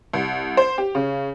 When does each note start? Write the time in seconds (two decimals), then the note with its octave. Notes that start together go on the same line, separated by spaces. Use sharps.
0.13 C2
0.57 C5
0.78 G4
0.95 C#3